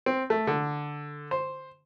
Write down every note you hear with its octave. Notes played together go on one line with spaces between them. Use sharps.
C4
A3
D3
C5